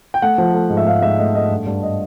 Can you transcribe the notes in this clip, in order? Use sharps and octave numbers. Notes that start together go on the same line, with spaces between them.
G5
A3 F#5
F3
A3
G#2
E5
G#2 F5
G#2 E5
A3 D#5
A3 D#5
G2
G2
D#5